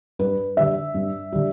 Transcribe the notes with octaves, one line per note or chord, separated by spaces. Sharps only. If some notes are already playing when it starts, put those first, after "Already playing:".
G2 B4
D3 G3 E5
G2
D3 G3